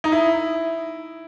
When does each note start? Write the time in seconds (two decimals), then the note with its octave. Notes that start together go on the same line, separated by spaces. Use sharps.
0.04 D#4
0.12 E4